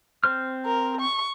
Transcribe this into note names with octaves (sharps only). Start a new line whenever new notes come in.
C4 C5 F6
A#4
C#6